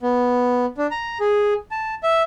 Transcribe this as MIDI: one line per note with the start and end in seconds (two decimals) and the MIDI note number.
0.03 0.66 59
0.78 0.87 62
0.91 1.18 82
1.20 1.54 68
1.71 1.95 81
2.03 2.22 76